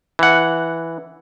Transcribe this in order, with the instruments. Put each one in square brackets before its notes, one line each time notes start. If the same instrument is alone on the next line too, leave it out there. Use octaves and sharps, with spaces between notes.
[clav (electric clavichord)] E3 F#5